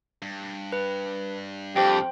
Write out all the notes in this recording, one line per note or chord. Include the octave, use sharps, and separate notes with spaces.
G2
B4
F2 G4 C5 G5